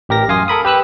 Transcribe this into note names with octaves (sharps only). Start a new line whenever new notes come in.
A1 G4 A#4 A#6
F#2 F5 G#5 C6 D#6
A4 A#4 B5 D#6
G4 B4 E6 F#6